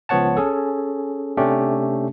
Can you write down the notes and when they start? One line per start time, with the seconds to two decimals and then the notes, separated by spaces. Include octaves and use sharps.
0.09 C#2 F3 B3 C#5 F#5 A5
0.37 C#4 G#4 A4
1.37 C3 A3 C#4 D4 G4